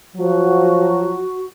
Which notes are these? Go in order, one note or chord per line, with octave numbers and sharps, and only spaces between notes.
F3 F#3 F#4